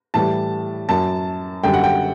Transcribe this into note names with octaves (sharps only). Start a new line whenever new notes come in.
A2 E3 G3 A5
F#2 F#3 A5
F#2 D3 G3 G5
F#5
G5